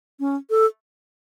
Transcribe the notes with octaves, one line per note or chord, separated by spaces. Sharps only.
C#4
A4